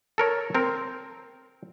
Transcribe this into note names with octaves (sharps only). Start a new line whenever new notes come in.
A4 A#4 C#5
C4 A#4